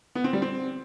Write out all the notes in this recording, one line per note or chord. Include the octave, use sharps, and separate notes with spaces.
B3
C4
G3
C4